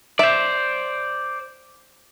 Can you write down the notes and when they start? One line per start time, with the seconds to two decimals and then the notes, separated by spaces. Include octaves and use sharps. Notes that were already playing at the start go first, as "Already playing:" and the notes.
0.19 C5 D5 E5